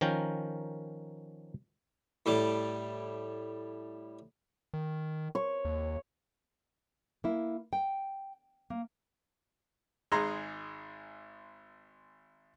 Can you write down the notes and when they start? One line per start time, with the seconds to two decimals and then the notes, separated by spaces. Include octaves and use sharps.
0.01 D#3 F3 C#4 A#4 G5
2.26 A2 G3 D6
4.74 D#3
5.35 C#5
5.65 D#2
7.24 A#3 E4
7.73 G5
8.70 A#3
10.12 G#1 G#3 D#4 G#4 A#5 C6